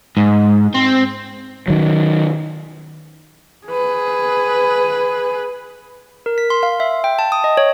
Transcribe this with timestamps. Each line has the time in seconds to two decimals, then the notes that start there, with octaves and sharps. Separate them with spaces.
0.17 G#2
0.74 C4
1.68 D#3 F#3
3.67 G#4 B4
6.26 A#4
6.38 B6
6.50 C6
6.63 F5
6.80 E5
7.04 G5
7.19 A5
7.32 D#6
7.44 D#5
7.57 C#5